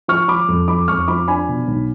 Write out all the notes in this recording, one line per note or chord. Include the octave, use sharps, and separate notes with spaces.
F3 C#6 F6
F3 B5 D6
F2
F3 B5 D6
F2 C#6 F6
F3 B5 D6
D4 G#5 B5
B2
B1